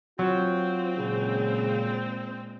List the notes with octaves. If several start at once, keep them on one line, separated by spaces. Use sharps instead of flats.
F#3 C4 F4
A#2 C#3 G#3